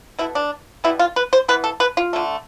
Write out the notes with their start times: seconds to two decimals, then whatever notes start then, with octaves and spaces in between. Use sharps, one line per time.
0.19 B2 A3 E4
0.35 D4
0.84 B2 G3 B3 E4
0.99 F4
1.16 B4
1.33 C5
1.48 E3 B3 B4
1.64 A4
1.80 B4
1.97 F4
2.13 D3 A3